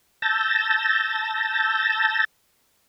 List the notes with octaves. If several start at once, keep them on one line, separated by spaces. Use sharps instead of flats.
A5 E6 G6 A6 A#6